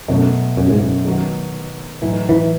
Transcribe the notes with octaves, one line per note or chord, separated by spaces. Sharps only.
F#2 B2 F#3 A3
F#2
G#2
F#2
D#3 F#3 B3 F#4
A2 E3 F#3 A3 D#4
E3